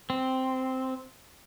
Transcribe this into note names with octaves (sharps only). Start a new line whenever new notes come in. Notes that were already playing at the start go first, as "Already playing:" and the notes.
C4